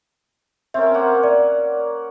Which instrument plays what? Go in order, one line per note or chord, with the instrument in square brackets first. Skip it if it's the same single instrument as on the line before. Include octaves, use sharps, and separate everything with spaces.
[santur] C4 C#4 A#4 [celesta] E5
[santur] A#3 C#5 F#5
[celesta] D5